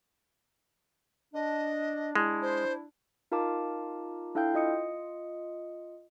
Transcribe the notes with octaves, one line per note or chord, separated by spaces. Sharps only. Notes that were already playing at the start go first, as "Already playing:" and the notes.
D4 D#5
G#3 D4 E4
C5
D#4 F4 A#4 F5 A5 D6
D4 E4 A4 F5 G5 G6
F4 D#5 D#6 C#7